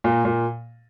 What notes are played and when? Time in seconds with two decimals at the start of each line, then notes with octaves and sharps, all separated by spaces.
0.04 A#2
0.25 A#2